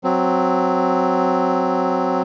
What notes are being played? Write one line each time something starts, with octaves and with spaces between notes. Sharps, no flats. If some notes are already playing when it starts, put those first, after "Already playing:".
F#3 C4